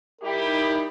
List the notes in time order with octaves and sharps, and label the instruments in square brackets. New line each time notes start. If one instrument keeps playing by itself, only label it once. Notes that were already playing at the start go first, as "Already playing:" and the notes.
[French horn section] G3 E4 G4 [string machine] D#4 [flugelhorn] A#4